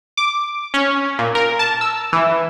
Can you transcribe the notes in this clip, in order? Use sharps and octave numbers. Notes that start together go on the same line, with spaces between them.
D6
C#4
A#2
A#4
A5
E6
E3